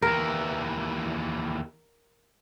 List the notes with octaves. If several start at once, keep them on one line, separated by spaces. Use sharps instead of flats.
D#2 E3 A#4